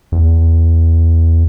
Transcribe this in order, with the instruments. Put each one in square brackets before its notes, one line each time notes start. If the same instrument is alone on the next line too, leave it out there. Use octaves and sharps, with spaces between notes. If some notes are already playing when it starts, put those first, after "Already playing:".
[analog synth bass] E2